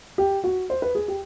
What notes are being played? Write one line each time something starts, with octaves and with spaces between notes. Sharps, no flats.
G4
F#4
C5
B4
G#4
G4